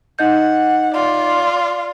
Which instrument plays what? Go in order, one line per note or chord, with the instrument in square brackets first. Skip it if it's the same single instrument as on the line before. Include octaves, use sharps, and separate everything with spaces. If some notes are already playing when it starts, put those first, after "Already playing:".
[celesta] D#4 D#5 G6 [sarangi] F#5
[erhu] F4 [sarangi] D5